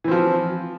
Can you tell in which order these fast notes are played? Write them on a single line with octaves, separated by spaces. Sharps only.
E3 C4 F3